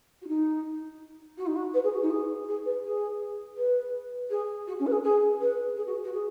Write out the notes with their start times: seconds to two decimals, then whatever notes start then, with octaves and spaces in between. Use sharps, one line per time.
0.22 F#4
0.28 D#4
1.38 F#4
1.47 D#4
1.56 F#4
1.74 B4
1.84 G#4
1.93 F#4
2.02 D#4
2.10 G#4
2.48 G#4
2.65 B4
2.85 G#4
3.57 B4
4.30 G#4
4.67 F#4
4.79 C#4
4.86 B4
4.92 G#4
5.03 G#4
5.41 B4
5.76 G#4
5.87 F#4
6.04 F#4
6.13 G#4